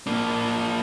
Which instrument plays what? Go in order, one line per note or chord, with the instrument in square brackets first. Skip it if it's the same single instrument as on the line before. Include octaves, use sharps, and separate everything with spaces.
[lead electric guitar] A#3 D4